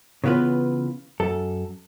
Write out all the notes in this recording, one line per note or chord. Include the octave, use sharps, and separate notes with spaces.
C#3 E3 B3 F4 B4
F#2 A4